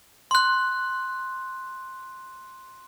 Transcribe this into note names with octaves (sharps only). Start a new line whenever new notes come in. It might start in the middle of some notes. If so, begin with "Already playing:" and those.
C6 F#6